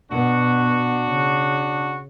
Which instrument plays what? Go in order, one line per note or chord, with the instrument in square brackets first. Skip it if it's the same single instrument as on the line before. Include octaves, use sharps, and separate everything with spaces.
[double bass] B2 B3 [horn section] D4 F#4
[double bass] C#3